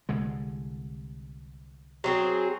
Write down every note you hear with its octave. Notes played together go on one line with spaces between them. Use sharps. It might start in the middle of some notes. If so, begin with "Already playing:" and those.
C2 D3 G#3
F#3 C4 G#4